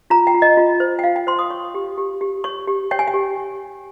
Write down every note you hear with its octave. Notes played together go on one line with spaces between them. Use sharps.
F4 A#5
G5
F4
D#5
F4
C5
G5
F4 F5
G5
C5 C6
D#6
C#5 C#6
G4
G4
G4
C#5 C#6
G4
C#5 G5
G#5
G5
G4